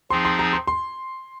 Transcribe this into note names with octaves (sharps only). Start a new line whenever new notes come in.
F3 C4 D#4 G#4 C6
C6
A#5
C6
C6